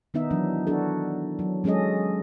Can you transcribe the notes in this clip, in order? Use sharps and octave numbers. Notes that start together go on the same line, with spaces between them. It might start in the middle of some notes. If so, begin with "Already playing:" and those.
D#3 B3 D#4 E5
E3 F#3 D4
D4 F#4 A4
F#3
F#3 G#3 C#4 G#4 A4 D#5